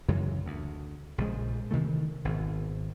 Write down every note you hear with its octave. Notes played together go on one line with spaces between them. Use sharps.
F#2 C#3 E3 G#3
D2
A#1 C#3 F3 G#3
C3 D#3 E3 A3
G#1 B2